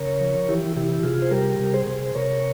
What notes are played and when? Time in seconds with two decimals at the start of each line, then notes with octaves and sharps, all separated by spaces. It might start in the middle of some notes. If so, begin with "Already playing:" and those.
Already playing: C#3 A#4 C#5
0.20 F3
0.49 E3 E4 G4
0.76 C3 E4 G4
1.03 C3 F4 G#4
1.22 C5
1.31 G3 G4 A#4
1.60 C3
1.73 G#4 C5
1.88 C3
2.15 C3 A#4 C#5